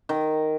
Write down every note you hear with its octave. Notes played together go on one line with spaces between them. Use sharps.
D#3